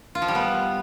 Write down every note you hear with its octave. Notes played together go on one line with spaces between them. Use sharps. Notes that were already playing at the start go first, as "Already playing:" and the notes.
F4
F3
G3
B3